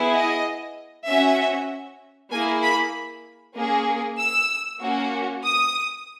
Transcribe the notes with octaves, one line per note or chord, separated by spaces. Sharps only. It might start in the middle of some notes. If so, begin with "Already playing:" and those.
Already playing: B3 E4 G#4
D#5
C#4 F#4 E5
A#3 E4 G#4 G#5
B5
A#3 C#4 G#4
E6
A#3 C#4 F#4
D#6